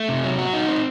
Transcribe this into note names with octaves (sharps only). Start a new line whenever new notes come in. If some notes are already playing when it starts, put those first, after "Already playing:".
Already playing: A3
C3
F#3
F#4
D#4
C4